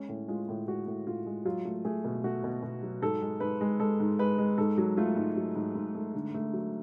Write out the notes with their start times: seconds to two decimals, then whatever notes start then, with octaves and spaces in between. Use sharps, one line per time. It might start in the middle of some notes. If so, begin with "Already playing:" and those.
Already playing: G#3 C#4
0.09 A2
0.28 G#3 F4
0.49 A2
0.67 G#3 F#4
0.87 A2
1.07 A2 F4
1.26 G#3
1.45 F#3 F4
1.65 A3
1.85 A3 G#4
2.04 B2
2.24 A3 F#4
2.44 B2
2.63 B2
2.83 F#3
3.02 G#2 A4
3.22 G#3
3.40 G#2 B4
3.61 G#3
3.79 G#3 A4
4.00 G#2
4.19 G#3 B4
4.38 G#3
4.58 G#2 A4
4.78 F#3
4.97 A3 F4
5.16 G#2
5.36 F#3
5.56 G#2
5.75 G#2
5.95 A3
6.15 D3
6.34 A3
6.53 F#3